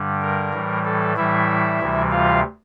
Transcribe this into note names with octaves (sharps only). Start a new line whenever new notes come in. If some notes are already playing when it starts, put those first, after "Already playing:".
Already playing: G2 D3 G3
A#4
A2 E3 G3
A4
A2 E3 G3 E4 E5
D2 C3 E3 G3
F4 F5